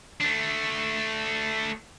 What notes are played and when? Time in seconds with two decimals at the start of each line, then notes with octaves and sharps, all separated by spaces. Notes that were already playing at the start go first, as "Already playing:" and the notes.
0.20 A3 D4